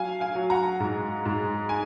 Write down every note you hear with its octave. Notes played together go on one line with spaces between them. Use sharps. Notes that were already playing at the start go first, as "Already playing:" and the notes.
Already playing: F#3 F5 G#5
F5 G#5
F#3
F#5 A#5
G#2
G#2
G#5